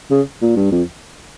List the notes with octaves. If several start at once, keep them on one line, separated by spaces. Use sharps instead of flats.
C#3
A#2
G2
F2